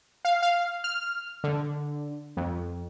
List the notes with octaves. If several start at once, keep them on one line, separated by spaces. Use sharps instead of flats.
F5
F5
F6
D3
F2